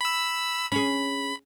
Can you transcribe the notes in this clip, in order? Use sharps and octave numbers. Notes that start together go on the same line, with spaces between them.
B5 E6
C#4 G#4 B5